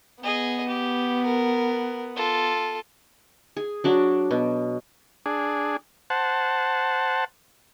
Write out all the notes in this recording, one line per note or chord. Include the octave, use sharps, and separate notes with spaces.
B3 G#4 D#5
G4
A#4
F4 A4
G#4
F#3 D4 F#4
B2
D4 G#4
C5 F#5 A5